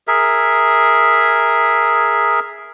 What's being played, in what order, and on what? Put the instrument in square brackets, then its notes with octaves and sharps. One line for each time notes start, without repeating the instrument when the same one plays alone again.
[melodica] G#4 A#4 E5